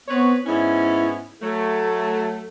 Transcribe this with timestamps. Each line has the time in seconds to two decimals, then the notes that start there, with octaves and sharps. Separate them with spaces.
0.08 B3 C4 B4 C#5
0.46 G#2 B3 C#4 E4
1.42 F#3 A3 A4